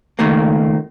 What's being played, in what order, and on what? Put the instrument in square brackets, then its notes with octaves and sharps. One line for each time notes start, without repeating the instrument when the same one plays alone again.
[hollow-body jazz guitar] C#2 D#3 A3 A#3